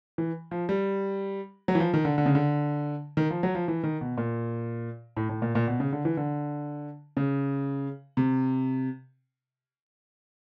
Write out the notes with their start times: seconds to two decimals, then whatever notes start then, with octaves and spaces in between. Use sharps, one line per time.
0.18 E3
0.51 F3
0.69 G3
1.68 F#3
1.75 E3
1.80 F3
1.94 D#3
2.05 D3
2.18 D3
2.26 C#3
2.35 D3
3.17 D#3
3.30 F3
3.43 F#3
3.55 F3
3.68 E3
3.84 D#3
4.01 B2
4.17 A#2
5.17 A2
5.29 A2
5.42 A#2
5.55 A#2
5.68 B2
5.80 C#3
5.93 D3
6.05 E3
6.17 D3
7.17 C#3
8.17 C3